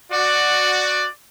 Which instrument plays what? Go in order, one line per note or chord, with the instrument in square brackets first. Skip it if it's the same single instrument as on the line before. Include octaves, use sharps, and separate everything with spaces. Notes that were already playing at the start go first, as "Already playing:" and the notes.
[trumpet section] F#4 D5